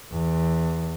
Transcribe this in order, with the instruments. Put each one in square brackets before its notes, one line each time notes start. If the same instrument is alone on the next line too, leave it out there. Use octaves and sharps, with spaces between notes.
[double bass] E2